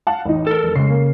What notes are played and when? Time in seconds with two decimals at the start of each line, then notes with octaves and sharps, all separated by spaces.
0.07 F5 F#5 A5
0.25 A1 D#4
0.47 A4 A#4
0.63 F1
0.75 C#3 G#3 C7
0.90 A#3